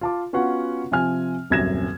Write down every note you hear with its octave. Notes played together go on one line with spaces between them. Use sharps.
F4 A5 D6
B3 C#4 F4 F#4 F#5
C3 F3 C4 G#5 F6
D#1 C2 F#2 G#6 A#6 E7